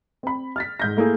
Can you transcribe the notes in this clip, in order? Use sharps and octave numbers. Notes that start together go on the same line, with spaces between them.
C4 B5
F6 A6 B6
G#2 G6 A#6
A3 A#3 E4 G#4